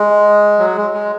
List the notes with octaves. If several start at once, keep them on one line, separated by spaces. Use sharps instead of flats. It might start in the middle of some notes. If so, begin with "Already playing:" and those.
Already playing: G#3
F#3
G#3
G#3